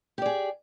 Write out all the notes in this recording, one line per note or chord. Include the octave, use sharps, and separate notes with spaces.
G4 G#4 D5